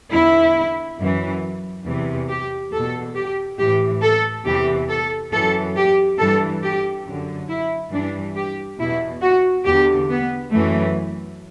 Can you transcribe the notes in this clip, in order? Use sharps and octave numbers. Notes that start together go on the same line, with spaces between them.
E2 D3 E4
F#2 E3
E2 C3 E3
G4
E2 B2 A4
G4
A2 E3 G4
A4
E2 C3 E3 G4
A4
F#2 E3 A4
G4
G2 E3 A4
G4
F#2 D3
E4
G2 E3 D4
G4
E2 B2 E4
F#4
E2 D3 G4
B3
F#2 E3 A3